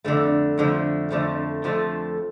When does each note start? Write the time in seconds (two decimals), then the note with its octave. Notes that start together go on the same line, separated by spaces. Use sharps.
0.04 F2 D3 F3 A3
0.58 F2 D3 F3 A3
1.10 F2 D3 F3 A3
1.64 F2 D3 F3 A3